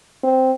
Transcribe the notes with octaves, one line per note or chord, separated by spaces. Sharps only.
C4